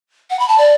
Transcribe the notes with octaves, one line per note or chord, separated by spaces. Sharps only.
F#5
B5
A5
D5